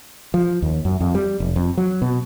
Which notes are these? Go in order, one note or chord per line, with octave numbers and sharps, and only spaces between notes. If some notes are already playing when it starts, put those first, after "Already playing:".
F3
D#2
F#2
F2
G3
F1
F2
F#3
B2